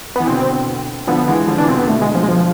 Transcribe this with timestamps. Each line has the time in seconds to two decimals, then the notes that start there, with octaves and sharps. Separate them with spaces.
0.16 E3 B3
0.27 B2 D3 C4
1.07 D3 F3 B3
1.28 E3 G#3
1.47 D3 F3
1.57 C3 E3 D4
1.68 B2 D3 C4
1.78 B3
1.87 B2 D3 A3
2.01 G#3
2.15 F3
2.23 G#3
2.28 F3